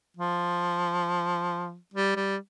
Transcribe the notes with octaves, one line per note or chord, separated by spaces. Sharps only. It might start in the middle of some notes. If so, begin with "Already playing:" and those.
F3
G3
G3